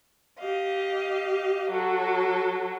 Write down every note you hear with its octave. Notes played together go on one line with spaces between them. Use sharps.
G4 D#5 F5
F#3 F#4 A4